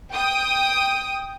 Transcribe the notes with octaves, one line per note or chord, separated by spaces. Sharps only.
G5 D#6